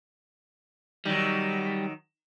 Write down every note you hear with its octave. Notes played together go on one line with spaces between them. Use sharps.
D#3 F#3 G3